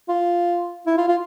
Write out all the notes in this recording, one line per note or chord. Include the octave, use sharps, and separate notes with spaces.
F4
E4
F4
F4